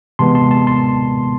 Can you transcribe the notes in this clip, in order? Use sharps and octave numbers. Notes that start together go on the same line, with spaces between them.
C3 E3 G#3 B3 A5 C6
A5 C6
A5 C6
A5 C6